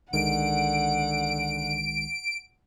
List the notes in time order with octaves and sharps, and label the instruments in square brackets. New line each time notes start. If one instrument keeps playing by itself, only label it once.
[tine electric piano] C2 D#3 G#3 [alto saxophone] D3 [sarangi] F#5 [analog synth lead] D7